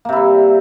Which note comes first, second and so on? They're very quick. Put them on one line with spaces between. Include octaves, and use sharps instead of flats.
A#3 C3 E4 G3